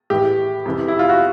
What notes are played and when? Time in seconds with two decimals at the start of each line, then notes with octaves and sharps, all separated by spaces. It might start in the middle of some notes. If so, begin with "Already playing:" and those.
0.10 A2 E3 G4
0.65 F2 C3 E3
0.88 E4
0.99 F4
1.09 F#4